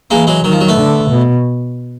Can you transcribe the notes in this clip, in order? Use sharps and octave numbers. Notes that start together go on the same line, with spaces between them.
E3 G#3 A#3
F#3 G#3
D#3 F#3
F3
F#3
A3 B3
D3
B2